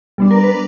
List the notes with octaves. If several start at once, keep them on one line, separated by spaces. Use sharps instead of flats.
G3 B3 D4
A#4
B4